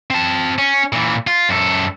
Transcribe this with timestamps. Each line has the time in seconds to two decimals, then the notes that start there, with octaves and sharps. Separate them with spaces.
0.10 C4 A5
0.58 C#4
0.92 A#2 E3
1.27 F4
1.49 F#2 A4